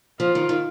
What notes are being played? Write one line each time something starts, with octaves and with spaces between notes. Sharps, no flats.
F3 F4
D#3
D#3